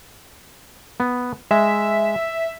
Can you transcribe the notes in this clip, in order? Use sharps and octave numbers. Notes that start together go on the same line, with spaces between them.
B3
G#3 E5